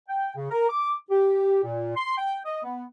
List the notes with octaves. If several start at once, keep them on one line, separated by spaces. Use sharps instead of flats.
G5
C#3
A#4
D6
G4
A#2
C6
G5
D#5
B3